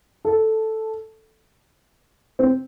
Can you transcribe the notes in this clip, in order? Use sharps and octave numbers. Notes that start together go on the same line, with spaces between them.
A4
C4